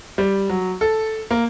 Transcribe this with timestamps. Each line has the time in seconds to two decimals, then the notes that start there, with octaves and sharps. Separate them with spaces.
0.18 G3
0.49 F#3
0.81 A4
1.31 A#3